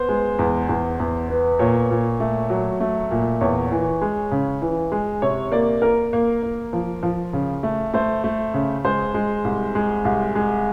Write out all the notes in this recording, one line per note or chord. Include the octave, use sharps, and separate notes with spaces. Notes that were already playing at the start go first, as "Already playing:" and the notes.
Already playing: B3 C5
G#3
E2
E2
E2
B3
A#2 C#5
A#2
A3
F#3
A3
A#2
E2 C#5
E3
G#3
C#3
E3
G#3
C3 C#5
A#3 D5
A#3 A#4
A#3
A#3
F3
F3
C#3
A3
A3 C5
A3
C#3
G#3 C5
G#3
C2
G#3
C2
G#3